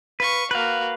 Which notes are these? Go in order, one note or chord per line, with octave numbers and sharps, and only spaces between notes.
B4 F5 C#6
A#3 F#4 B4 F5